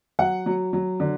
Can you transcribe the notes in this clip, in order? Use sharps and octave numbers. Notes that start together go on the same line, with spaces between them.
F#3 F#5
F#3
F#3
D3